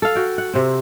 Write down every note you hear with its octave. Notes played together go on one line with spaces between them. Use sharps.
A4 F5
F#4 G5
F#5
C3 C4